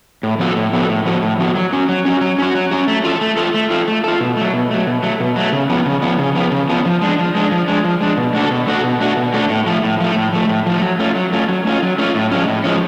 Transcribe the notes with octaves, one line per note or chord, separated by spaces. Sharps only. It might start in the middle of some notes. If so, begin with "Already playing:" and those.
A2
F3 B3 F#4 A4
A2
F3 B3 F#4 A4
A2
F3 B3 F#4 A4
A2
F3 B3 F#4 A4
F#3
C#4 F#4
F#3
C#4 F#4
F#3
C#4 F#4
F#3
C#4 F#4
A3
F4 A4
A3
F4 A4
A3
F4 A4
A3
F4 A4
B2
F#3 A3
B2
F#3 A3
B2
F#3 A3
B2
F#3 A3
C#3
F3 B3
C#3
F3 B3
C#3
F3 B3
C#3
F3 B3
F3
G#3 D4
F3
G#3 D4
F3
G#3 D4
F3
G#3 D4
B2
A3 D4 F#4 A4
B2
A3 D4 F#4 A4
B2
A3 D4 F#4 A4
B2
A3 D4 F#4 A4
A2
F3 A3
A2
F3 A3
A2
F3 A3
A2
F3 A3
F#3
A3 C#4 F4
F#3
A3 C#4 F4
F#3
A3 C#4 F4
F#3
A3 C#4 F4
A2
F3 G#3 C#4
A2
F3 G#3 C#4